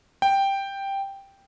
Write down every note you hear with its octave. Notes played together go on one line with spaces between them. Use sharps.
G5